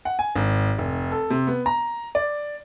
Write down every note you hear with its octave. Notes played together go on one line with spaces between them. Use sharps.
F#5
G#5
G#1
F1
A4
C3
B3
A#5
D5